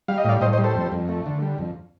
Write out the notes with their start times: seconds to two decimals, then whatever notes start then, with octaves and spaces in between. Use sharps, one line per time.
0.08 G3 F5
0.18 D#5
0.24 A2 D5 F5
0.41 A2 C5 D#5
0.53 C5 D#5
0.58 G3
0.64 A4 C5
0.75 F2
0.92 F2
1.09 A3
1.26 D3
1.42 G3
1.58 F2